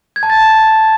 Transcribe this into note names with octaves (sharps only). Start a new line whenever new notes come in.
G#6
A5
A6